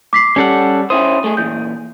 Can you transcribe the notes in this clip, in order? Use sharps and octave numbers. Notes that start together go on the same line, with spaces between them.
D6 B6 C7
G3 C#4 A4 F#5
C#4 E4 C5 D#6
A3 G#4
A#2 E3 G6